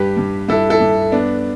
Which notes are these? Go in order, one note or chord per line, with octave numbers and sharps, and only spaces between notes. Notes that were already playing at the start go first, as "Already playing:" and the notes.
Already playing: G2 G3 G4 B4
G2
G2 E4 A4
E4 A4
G2
B3 D4